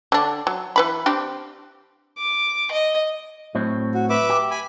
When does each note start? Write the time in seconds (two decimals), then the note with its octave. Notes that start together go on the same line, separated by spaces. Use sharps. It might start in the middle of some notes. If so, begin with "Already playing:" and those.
0.12 D3 D4
0.47 F#3
0.76 E3 B4 B5
1.06 C4 D4 G4
2.18 D6
2.71 D#5
3.55 A2 F#3 C4
3.95 F#4
4.10 B4 E5 D6
4.30 G4
4.51 G#5 B5